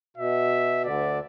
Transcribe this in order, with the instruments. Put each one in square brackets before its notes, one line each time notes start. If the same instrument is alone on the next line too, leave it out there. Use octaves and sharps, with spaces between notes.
[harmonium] B2 [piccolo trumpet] E5
[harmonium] D2 D3 [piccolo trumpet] D5